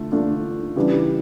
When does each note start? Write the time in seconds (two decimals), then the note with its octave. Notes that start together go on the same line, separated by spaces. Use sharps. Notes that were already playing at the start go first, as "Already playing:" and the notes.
Already playing: D3 A3 D4 F4
0.12 D3 A3 D4 F4
0.76 C#3 E3 G3 D4 G4